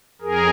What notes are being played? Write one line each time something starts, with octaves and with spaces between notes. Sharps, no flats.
F2 G#4 A#4